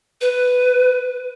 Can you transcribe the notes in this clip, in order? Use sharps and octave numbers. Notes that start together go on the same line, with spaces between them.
B4